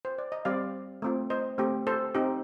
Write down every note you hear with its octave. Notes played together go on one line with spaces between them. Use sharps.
C5
D5
D#5
G3 C4 G4 D5 F5
A3 C4 F4
C5 D#5
A3 C4 G4
A4 C5
C4 D#4 G4